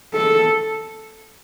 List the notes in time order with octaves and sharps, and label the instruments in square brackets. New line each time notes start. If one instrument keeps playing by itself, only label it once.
[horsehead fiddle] A4